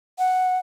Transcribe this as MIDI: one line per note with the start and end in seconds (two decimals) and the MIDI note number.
0.19 0.58 78